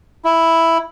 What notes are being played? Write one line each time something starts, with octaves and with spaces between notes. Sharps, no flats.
E4